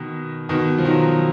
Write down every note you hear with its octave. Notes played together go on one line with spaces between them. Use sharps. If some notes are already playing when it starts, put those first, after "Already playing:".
Already playing: B2 D#3
B2 D#3
F3
D#3 F#3